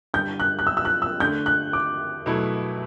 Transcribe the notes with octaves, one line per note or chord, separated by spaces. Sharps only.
G2 D3 G3 G6
F#6
F#6
E6
E6
F#6
E6
D3 A3 D4 G6
F#6
D6
B2 F#3 A3 E4